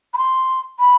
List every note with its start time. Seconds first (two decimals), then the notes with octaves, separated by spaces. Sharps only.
0.14 B5
0.18 C6
0.79 B5